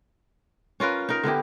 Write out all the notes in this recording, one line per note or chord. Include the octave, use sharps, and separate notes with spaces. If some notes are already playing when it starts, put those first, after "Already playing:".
C#4 F4 A#4 B4
D#4 A#4
D3 B3 E4 G4